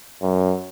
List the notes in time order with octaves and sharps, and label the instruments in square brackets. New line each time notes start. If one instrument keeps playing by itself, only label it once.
[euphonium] F#2